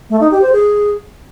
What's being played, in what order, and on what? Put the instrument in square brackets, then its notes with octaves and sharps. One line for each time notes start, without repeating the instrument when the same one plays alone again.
[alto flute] A3
D#4
G4
C5
G#4